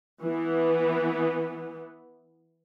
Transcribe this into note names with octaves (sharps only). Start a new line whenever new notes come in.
E3 B3